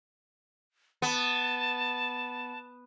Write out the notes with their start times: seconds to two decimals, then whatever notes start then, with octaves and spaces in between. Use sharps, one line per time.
1.02 B3 A5